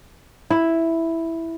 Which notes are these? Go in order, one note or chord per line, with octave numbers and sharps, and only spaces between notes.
E4